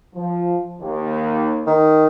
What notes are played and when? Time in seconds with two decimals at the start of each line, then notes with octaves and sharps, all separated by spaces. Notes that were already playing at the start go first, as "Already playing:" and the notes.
0.15 F3
0.80 D#2
1.67 D#3